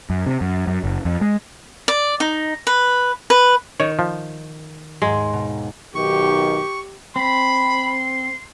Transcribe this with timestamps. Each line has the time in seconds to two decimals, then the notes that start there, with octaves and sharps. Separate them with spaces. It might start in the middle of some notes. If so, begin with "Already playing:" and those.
0.10 F#2
0.26 C3
0.41 F#2
0.67 F#2
0.84 F#1
1.05 F2
1.21 G#3
1.88 D5
2.20 D#4
2.67 B4
3.30 B4
3.80 D#3 C#5
3.99 F3
5.02 D#2 G#2 G#3 C6
5.33 B2
5.95 B1 D#3 G4 C#6
7.16 C4 B5 C6